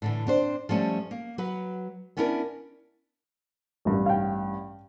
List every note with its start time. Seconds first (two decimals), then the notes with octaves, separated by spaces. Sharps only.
0.02 A2 D3 E3
0.27 C4 D4 C5
0.69 F3 G3 A3 C#4
1.11 A#3
1.38 F#3 B4
2.17 B3 C#4 D4 E4 G4 A#4
3.85 A1 G2
4.06 F5 G5